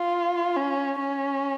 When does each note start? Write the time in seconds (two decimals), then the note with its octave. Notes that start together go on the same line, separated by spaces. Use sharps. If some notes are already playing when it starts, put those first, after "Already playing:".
Already playing: F4
0.57 C#4
0.99 C#4